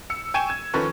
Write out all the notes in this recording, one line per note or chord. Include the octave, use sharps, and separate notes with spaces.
E6 C#7
G5 G#5 C#6 G#6 D#7 E7
G#6
D#3 F3 C#4 A4 B4 C#6